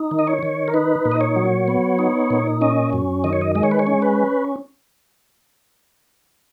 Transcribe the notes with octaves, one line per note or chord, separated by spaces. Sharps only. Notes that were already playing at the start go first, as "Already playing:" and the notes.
Already playing: D#4
D#3
D#5
C#5
D#3
A#4
D#4 B4
A#2
D#5
C#5
F#3
B3
D#4
A#2
C#4 D#5
F#2
D#3 D#5
C#5
D#5
G#3 D#5
C#5
B4
C#5
C#4
B4